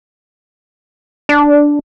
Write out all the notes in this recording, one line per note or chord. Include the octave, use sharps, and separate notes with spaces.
D4